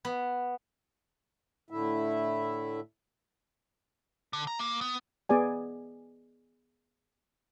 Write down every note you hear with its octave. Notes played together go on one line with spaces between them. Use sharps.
B3
A2 D3 A3 E4 E5
D3
A#5
A#3
B3
B3 G#4 D5 G#5